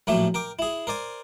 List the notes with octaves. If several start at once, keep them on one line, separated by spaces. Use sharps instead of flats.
A#1 A2 F#3 A3 G4 E5
A#4 G5 D6
E4 G#4
A#4 C5 D5 G#5